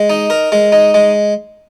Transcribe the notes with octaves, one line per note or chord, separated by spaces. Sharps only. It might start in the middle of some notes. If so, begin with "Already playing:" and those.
Already playing: G#3
D#4
A#4
G#3
D#4
G#3